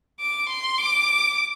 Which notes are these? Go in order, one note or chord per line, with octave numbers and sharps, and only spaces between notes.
D6
C6
D6